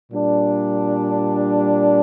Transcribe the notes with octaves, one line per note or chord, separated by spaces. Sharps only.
A#2 G3 D4